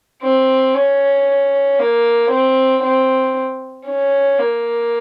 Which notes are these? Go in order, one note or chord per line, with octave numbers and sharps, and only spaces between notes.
C4
C#4
A#3
C4
C4
C#4
A#3